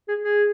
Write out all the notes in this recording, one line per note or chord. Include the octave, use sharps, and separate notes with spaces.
G#4
G#4